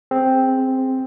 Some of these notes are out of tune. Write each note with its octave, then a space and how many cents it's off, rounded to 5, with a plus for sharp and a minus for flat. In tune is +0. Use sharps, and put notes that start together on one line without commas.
C4 +0 G#4 +0